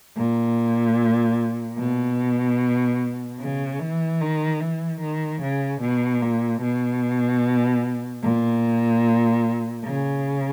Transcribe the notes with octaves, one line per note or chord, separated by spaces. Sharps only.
A#2
B2
C#3
E3
D#3
E3
D#3
C#3
B2
A#2
B2
A#2
C#3